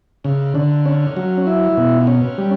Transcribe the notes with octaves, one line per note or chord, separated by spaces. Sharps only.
C#3
D3
C#4
F#3
E4
B2
C#4
G3